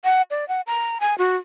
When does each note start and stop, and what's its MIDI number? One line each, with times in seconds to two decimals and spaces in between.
0.04 0.22 78
0.31 0.47 74
0.48 0.61 78
0.67 0.98 82
1.00 1.17 80
1.18 1.36 66